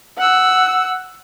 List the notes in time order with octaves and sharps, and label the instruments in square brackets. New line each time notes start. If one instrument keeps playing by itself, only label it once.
[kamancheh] F#5 E6